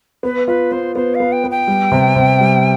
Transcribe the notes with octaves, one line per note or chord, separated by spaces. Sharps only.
B3 B4
F4 B4
B3 C5
B3 C5
F5
B3
G5
B3
G5
G3
C3
C3
G3